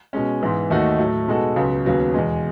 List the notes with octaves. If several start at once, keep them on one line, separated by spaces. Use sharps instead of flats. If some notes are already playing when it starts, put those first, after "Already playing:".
B2 G#3 C#4
G#2 E3 B3
D#2 D#3 A3 D#4 F#4
A2 F#3 A3
B2 G#3 D#4 F#4 A4
C#2 C#3 F#3 B3
D#2 C#3 F#3 B3
E2 B2 G#3